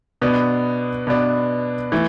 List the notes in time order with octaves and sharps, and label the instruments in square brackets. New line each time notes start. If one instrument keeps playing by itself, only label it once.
[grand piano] B2 B3 D4
B2 B3 D4
E3 A3